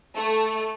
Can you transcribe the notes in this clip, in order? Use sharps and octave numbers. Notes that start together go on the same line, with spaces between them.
A3